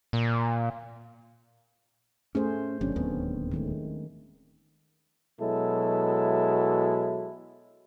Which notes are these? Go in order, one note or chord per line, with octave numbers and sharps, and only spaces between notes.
A#2
A3 C#4 G#4 C5
G1 C3 F#3 C#4 D4
D1 D#2 B3 C4
D#3 G#3 A3
B2 F#3 G#3 E4 A4